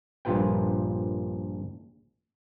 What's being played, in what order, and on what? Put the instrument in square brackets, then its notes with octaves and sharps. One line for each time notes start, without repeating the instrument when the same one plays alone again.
[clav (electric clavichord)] A#1 G2 A#2 F4 B4 G5